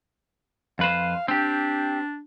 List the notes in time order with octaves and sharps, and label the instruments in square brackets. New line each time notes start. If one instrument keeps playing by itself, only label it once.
[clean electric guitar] F2 B4 C5 [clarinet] F5
[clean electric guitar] C4 G4 [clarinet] D4